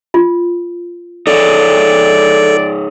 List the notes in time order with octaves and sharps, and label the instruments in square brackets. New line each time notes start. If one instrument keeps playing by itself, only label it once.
[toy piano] F4
[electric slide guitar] D#4 G#4 C#5 [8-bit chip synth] A4 [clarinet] D5